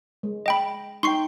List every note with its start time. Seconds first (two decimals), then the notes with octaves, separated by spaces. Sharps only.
0.23 G#3
0.46 D#5 G5 B5
1.03 D#4 G5 C6 C#6 C7